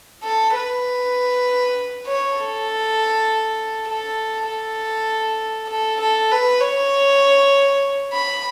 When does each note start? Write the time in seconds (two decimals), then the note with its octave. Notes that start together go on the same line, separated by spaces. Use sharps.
0.24 A4
0.55 B4
2.07 C#5
2.37 A4
3.88 A4
4.48 A4
5.69 A4
6.01 A4
6.31 B4
6.60 C#5
8.13 B5